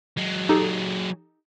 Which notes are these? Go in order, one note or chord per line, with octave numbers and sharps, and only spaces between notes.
F#3 G#3
D#4 G4 A4